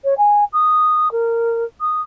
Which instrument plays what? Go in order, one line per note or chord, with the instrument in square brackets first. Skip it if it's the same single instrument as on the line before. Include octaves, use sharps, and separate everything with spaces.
[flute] C#5
G#5
D#6
A#4
D#6